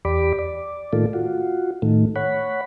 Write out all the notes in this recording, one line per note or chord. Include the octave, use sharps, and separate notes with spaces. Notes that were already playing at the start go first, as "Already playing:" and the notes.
E2 G4 D5 B5 D6
D5
A2 D#3 A3 A#3 F4 A4
F4 F#4
A2 D#3 A3
C#5 F#5 B5